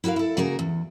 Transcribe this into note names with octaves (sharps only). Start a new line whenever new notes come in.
E4 F#4 A4 A#4 F5
E4 A4
C#3 A#3 F#4 G#4 A#4
E2